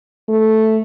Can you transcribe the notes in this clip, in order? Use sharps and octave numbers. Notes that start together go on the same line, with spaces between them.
A3